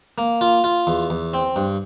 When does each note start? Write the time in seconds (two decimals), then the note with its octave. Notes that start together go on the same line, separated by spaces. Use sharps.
0.18 A#3
0.41 F4
0.64 F4
0.87 E2
1.10 E2
1.34 C4
1.56 G2